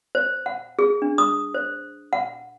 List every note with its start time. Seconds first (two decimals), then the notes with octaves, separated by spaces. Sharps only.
0.15 C5
0.46 F#5
0.79 G#4
1.02 D4
1.18 D#6
1.54 C5
2.13 F#5